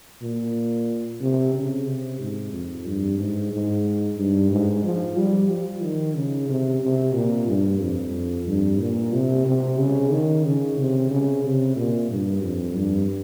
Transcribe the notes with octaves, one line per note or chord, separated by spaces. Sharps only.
A#2
C3
C#3
C3
G#2
F2
G2
G#2
G#2
G2
G#2
F3
G3
F3
D#3
C#3
C3
C3
A#2
G2
F2
G2
A#2
C3
C3
C#3
D#3
C#3
C3
C#3
C3
A#2
G2
F2
G2